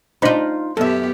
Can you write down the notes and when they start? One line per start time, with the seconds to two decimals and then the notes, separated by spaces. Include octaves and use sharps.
0.22 D4 D#4 F4 C5 B5
0.77 F#2 B3 G4 A4 E5